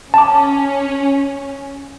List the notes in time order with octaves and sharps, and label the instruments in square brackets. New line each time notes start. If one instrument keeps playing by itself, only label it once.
[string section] C#4 [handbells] A5 D6